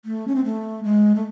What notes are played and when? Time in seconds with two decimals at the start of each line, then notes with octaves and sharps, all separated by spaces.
0.05 A3
0.28 C#4
0.35 C4
0.45 A3
0.84 G#3
1.15 A3